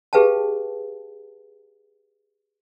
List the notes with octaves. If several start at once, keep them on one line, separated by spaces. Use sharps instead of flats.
G4 G#4 B4 F5 G5 A5